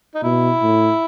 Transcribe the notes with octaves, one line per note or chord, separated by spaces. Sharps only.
D#4
B2 E4
A2